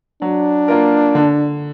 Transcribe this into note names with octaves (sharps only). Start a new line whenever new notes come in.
F#3 D4
A#3 F4 A#4
D3